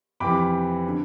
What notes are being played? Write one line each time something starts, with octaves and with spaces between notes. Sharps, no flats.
F2 C3 E3 B5 D6
D3